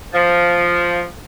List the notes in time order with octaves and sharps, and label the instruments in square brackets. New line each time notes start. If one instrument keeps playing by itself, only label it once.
[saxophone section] F3